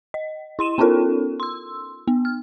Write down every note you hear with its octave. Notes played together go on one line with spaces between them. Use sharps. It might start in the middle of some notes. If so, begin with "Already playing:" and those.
D#5
E4 C6 D#7 E7
B3 C#4 D#4 F4 A4 A#4
C6 E6
B3
F6